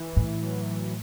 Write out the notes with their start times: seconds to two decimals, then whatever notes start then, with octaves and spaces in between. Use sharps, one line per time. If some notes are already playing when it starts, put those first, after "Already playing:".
Already playing: E3
0.17 A2
0.42 F#3
0.67 E3
0.80 E3